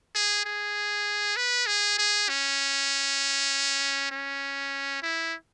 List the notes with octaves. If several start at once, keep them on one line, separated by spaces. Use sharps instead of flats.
G#4
G#4
B4
G#4
G#4
C#4
C#4
E4